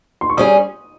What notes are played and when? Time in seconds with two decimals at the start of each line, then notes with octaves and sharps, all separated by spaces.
0.21 C6
0.30 C#6
0.37 G3 C#4 G#4 D#6